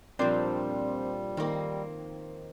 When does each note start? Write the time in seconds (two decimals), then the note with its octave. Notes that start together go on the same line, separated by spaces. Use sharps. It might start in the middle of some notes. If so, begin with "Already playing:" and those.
0.19 A#2 F3 G3 C4 D4 C5
1.37 D#3 A#3 C4